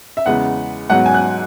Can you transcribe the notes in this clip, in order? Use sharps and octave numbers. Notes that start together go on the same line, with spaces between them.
E5
E2 C#3 G#3 B3 F#5
G#2 F#3 B3 F#5
G#5
F#6